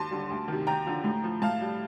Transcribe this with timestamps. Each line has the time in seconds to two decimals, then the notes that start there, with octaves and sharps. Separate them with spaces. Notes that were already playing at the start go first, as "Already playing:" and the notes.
Already playing: D#2 A5 C6
0.11 D3 G3
0.30 D2
0.48 C3 D#3
0.67 D#2 G5 A#5
0.87 D3 F3
1.04 A2
1.24 F3
1.42 A2 F5 A5
1.61 G3